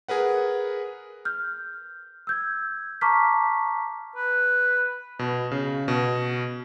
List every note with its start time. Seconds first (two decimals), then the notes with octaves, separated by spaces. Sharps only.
0.08 G#4 A#4 B4 F#5
1.25 F6 G6
2.27 E6 G6 G#6
3.01 A5 A#5 C#6 D6 F6 B6
4.16 B4
5.19 B2
5.51 C#3
5.88 B2